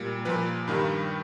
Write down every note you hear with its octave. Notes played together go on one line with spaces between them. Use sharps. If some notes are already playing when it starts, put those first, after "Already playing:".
Already playing: A#2 G3
A#2 F3 B4
G2 D#3 G3